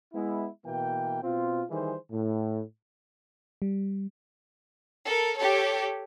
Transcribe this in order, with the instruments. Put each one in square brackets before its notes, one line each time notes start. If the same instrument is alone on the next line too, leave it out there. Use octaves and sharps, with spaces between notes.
[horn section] G#3 B3 E4
B2 E3 A#3 G5
B2 C4 F4
D#3 E3 G3 G#4 C5
A2
[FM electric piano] G3
[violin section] A4 A#4
G4 A4 C#5